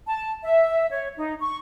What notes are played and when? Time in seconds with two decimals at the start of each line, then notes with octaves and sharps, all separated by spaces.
0.08 A5
0.44 E5
0.91 C#5
1.17 D#4
1.41 C#6